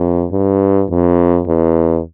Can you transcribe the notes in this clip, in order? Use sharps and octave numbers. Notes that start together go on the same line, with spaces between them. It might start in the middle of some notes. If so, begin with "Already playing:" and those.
Already playing: F2
G2
F2
E2